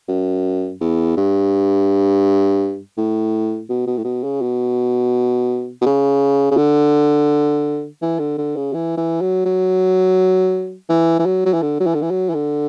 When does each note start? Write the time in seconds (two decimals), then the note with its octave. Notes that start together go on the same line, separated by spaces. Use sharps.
0.08 F#2
0.81 E2
1.17 G2
2.98 A2
3.70 B2
3.87 B2
3.97 A2
4.05 B2
4.24 C#3
4.42 B2
5.81 B2
5.86 C#3
6.51 C#3
6.57 D3
8.02 E3
8.19 D3
8.38 D3
8.56 C#3
8.74 E3
8.97 E3
9.21 F#3
9.46 F#3
10.89 E3
11.19 E3
11.26 F#3
11.46 F#3
11.54 E3
11.62 D3
11.80 F#3
11.86 E3
11.95 D3
12.02 E3
12.11 F#3
12.30 E3
12.34 D3